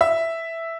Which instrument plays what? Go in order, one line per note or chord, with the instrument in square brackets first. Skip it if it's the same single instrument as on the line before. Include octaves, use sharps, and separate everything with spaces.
[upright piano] E5